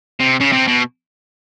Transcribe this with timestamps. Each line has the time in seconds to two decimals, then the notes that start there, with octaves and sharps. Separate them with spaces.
0.20 C3
0.41 C#3
0.52 C3
0.68 B2